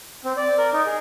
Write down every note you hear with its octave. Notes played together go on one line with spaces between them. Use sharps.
C4
D5
A#4
D#4
G#4